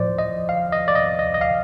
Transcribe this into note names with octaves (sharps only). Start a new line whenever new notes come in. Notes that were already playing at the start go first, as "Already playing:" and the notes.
Already playing: A2 F3 C5 D5
D#5
F5
D#5
D5
D#5
D#5
D#5
F5